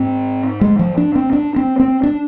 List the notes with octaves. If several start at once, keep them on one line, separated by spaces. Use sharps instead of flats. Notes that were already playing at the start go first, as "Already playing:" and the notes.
Already playing: G#2 C4
G#3
F3
D4
C4
D4
C4
C4
D4